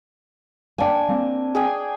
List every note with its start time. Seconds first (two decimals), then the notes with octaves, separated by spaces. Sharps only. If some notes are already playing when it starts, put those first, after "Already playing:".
0.78 A#3 D4 G5 G#5
1.09 A#3 C4
1.55 G#4 G5 G#5